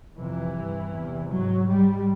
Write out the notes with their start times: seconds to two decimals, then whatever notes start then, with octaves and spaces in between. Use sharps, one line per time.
0.17 F2 C3 E3
0.54 G2
0.92 E2 C3
1.29 G#2 F#3
1.68 G#2 G3